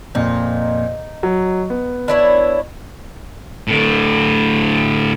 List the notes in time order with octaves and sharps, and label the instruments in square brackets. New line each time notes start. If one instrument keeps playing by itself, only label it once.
[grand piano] F2 A#2 [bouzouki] D#4
[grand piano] F#3
B3
[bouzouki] D4 E4 C#5
[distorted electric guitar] A2 D3